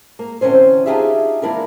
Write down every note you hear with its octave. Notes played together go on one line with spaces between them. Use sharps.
A#3
D3 E3 C4 C#4 C5
D4 D#4 F4 G4 G#4 E5
E3 A#3 D4 E4 A#4